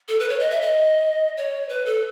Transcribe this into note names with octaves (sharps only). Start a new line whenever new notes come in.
A4
B4
C#5
D#5
E5
D#5
C#5
B4
A4